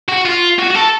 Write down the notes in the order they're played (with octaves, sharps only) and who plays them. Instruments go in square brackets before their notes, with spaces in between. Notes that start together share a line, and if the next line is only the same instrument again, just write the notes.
[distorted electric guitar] F#4
F4
F#4
F#4
A4